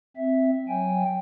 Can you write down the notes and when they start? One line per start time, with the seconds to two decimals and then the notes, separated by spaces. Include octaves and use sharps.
0.17 C4 E5
0.68 F#3 G5 G#5